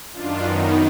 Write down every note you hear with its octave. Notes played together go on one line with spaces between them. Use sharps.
F#2 D#3 D4 F4
B3 D#4